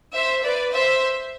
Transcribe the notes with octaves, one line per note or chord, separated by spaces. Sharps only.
C5 E5
B4 D5
C5 E5